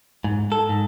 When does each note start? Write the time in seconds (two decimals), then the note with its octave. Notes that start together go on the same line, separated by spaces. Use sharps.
0.24 G#2
0.52 A4
0.69 G#2